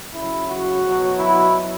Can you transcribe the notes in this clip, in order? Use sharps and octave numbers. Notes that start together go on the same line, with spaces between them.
C#3 F#3 E4
F#4
B2 F#3
E4